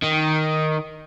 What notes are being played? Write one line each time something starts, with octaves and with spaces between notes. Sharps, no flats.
D#3